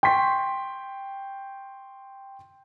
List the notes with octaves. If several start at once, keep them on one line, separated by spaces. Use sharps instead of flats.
G5 C6 C#6 B6